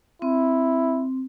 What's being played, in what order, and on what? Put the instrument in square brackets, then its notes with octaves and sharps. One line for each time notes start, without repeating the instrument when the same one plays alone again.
[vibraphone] C4 [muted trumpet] E4